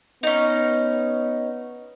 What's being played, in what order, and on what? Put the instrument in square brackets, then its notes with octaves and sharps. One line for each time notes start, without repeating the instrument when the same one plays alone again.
[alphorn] B3 [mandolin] C#4 D#4